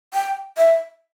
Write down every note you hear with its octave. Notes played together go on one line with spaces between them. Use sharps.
G5
E5